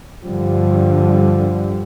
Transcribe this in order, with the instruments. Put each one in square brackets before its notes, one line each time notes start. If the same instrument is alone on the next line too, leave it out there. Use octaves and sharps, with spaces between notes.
[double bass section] G2 D3 G3 [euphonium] F3